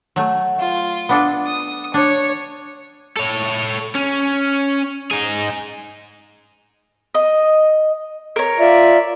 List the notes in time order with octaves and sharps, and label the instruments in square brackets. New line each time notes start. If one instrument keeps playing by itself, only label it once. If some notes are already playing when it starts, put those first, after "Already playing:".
[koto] F#3 A3
[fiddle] F4
[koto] B3 D4 A4
[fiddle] D#6
[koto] D4 [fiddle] C#5
[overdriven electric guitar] A4 C#5
C#4
D#4 G#4
[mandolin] D#5
A#4 C#5
[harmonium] F4 D5 E5